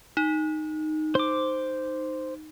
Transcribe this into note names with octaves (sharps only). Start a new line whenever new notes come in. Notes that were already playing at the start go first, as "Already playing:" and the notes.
D#4
C5 D6